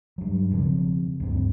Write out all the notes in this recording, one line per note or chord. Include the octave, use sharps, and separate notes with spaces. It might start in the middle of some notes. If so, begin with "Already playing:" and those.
G2 F#3
E1 C#3 F3 C4
D2 G2 C4